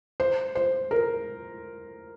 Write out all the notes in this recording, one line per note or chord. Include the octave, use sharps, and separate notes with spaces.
C5
C5
A#4